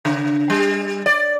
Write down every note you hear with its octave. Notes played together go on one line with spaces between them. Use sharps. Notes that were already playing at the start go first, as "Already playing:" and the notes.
C#3
G3
D5